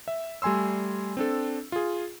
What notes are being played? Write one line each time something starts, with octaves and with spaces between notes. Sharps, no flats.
E5
G3 A3 G#5 C6 E6
C4 D4 A4
F4 G#4